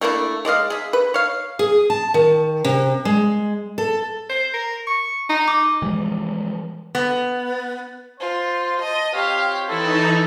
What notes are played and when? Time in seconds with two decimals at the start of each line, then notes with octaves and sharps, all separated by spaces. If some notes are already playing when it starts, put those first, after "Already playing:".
0.01 A3 A#3 D4 E4
0.45 G#3 D5 D#5 F5
0.70 G#4 E5
0.93 B4
1.14 C#5 F5
1.59 G#4
1.90 A5
2.14 D#3
2.65 C3
3.05 G#3
3.78 A4
4.29 C5
4.54 A#4
4.87 C#6
5.29 D#4
5.48 D6
5.82 E3 F3 G3 G#3
6.95 B3
8.20 F4 C5
8.81 D#5 A5
9.14 C4 F4 G4 C#5 F5
9.70 E3 D#4 E4 A4